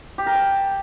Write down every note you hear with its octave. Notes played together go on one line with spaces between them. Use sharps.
G4
A#4
A5